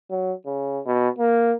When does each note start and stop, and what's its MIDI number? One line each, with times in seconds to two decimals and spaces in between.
0.10 0.33 54
0.46 0.80 49
0.86 1.09 47
1.19 1.54 58